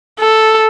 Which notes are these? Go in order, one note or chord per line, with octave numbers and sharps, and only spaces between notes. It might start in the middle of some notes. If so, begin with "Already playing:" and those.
A4